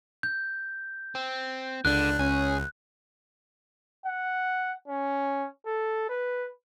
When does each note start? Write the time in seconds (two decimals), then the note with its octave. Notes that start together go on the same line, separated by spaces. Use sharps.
0.23 G6
1.15 C4
1.85 C#2 D3 D4 F#6
2.19 C#2 C#4 G#4
4.06 F#5
4.88 C#4
5.66 A4
6.09 B4